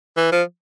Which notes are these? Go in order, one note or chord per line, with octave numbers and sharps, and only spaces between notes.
E3
F3